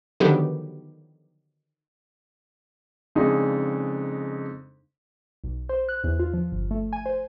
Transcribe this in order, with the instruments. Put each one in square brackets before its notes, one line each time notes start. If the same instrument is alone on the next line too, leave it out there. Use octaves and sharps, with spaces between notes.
[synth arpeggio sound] D3 D#3 F3 F#3 B3 G4
[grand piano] F2 C#3 G#3 D4 D#4
[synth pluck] B1
C5
F#6
E2
F4
F3
G1
A3
G#5
C5